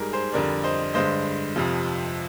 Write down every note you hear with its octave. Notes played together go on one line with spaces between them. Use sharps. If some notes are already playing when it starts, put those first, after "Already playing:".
Already playing: G#2 G3 G#4 A#4
G#4 C5
F2 D3 G3 A#4 D5
C5 D#5
G2 D3 G#3 C5 D#5
F2 C3 F3